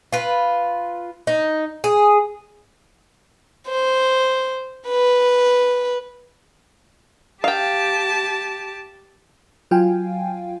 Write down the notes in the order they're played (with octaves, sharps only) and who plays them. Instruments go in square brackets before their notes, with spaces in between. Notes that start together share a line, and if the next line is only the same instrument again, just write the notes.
[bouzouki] F4 B4
D#4
G#4
[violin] C5
B4
[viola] G4 A5 [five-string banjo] F5 G5
[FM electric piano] F#3 F4 F5 G5 G#5